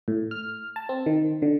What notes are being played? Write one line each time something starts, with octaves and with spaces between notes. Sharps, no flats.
A2
F6
A5
C4
D#3
D3